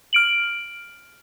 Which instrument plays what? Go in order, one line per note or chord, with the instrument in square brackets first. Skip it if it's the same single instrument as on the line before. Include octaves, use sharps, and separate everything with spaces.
[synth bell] F6 D7 F#7